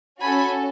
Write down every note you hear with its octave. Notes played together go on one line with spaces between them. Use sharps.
C#4 F#4 A4 G#5 B5